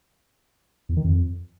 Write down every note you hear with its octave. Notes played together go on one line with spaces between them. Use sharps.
E2
D#3
F2